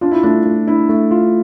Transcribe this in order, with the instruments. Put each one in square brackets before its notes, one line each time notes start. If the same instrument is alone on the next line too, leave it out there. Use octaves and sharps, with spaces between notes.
[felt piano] D4 [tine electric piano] F4
[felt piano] E4
[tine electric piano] A3 [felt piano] D4
[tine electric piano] A3
[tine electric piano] D4 [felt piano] E4
[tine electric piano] A3
F4